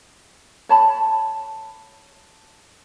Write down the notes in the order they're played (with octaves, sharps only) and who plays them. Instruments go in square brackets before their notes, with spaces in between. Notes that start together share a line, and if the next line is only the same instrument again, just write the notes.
[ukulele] C#5 A5 B5